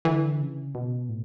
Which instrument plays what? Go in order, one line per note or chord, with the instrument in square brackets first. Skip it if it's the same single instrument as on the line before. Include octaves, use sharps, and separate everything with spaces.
[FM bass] D3 [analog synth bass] E3
[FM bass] C#3
B2
A2